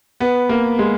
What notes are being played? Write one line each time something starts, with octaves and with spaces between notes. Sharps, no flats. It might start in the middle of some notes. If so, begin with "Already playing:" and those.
B3
A#3
G#3